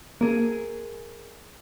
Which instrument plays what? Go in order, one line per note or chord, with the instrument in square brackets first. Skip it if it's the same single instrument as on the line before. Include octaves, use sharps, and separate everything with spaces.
[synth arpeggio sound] A#3 [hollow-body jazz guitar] G#4 A#4